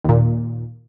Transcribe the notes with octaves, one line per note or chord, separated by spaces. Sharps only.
D#2 A#2